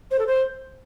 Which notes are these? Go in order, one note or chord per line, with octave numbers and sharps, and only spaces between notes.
C5
A4
C5